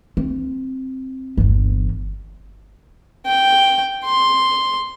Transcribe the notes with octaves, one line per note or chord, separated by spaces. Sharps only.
C4
G1 E2
G5
C6